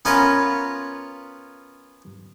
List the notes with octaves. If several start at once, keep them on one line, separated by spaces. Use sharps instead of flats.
B3 C#4 F4 A#4 B4 C#5